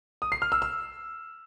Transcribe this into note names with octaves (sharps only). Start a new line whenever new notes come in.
D#6
C7
F6
E6
E6